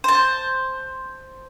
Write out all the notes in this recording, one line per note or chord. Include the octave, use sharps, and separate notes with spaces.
C5 A5